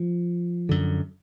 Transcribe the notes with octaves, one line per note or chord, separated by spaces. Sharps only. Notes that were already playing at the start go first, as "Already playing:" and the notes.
Already playing: F3
F#2 D3